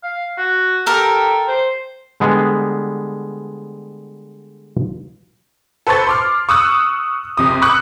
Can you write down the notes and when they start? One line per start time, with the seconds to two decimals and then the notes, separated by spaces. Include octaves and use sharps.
0.04 F5
0.38 F#4
0.86 G4 A4 A#4
1.48 C5
2.20 D3 G3 G#3 B3
5.87 A4 B4 C5 A5 C#6 A6
6.07 C6 D6 F6
6.49 C#6 D#6 E6 F#6
7.37 F#1 C3 D#6
7.62 B5 C#6 D6 E6 F#6